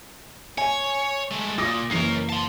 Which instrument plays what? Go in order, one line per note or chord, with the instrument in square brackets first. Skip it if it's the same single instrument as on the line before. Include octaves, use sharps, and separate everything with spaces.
[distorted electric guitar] C#5 [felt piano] G#5
[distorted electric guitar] G#3 A3
[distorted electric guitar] A#2 [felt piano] D6 D#6 A#6
[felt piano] F#1 E3 C7 [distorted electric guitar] C#4 A#4
[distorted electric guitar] A5 C6